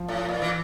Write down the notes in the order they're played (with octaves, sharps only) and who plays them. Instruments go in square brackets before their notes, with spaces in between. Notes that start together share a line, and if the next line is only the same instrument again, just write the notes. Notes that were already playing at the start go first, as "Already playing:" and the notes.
Already playing: [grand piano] F3
[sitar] A2
A#2
E3